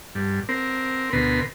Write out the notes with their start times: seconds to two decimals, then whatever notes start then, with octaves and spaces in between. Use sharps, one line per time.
0.15 G2
0.49 C4 A#4
1.13 D2 B2 A#4 B4 C6